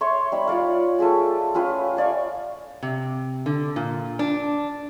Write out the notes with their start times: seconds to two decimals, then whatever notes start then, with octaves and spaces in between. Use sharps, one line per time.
0.01 C#5 E5 C6 C#6
0.32 G3 D#4 B5
0.48 F4 C#5 D5 F5
0.99 A3 F4 G4 G#4
1.54 C#4 F4 G4 B4
1.97 C#5 D5 F5 C#6
2.83 C3
3.46 D3
3.76 A#2
4.19 D4